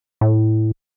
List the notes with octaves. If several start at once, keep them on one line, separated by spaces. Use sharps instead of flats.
A2